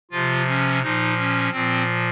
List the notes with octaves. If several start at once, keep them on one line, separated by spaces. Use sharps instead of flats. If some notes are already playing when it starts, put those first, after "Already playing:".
C3 F3 F4
C#4
A#2 F3 D#4
C#4
A#2 F3 C4